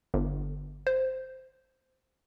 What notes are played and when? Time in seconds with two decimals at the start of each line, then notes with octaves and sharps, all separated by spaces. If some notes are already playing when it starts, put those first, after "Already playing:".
0.14 G1
0.87 C5